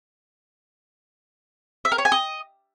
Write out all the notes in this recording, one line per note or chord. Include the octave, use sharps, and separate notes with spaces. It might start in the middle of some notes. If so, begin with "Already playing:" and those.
E5
A#4
C#5
G#5
D#5